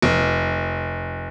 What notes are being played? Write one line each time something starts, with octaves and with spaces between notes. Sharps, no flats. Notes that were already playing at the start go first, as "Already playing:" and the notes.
F1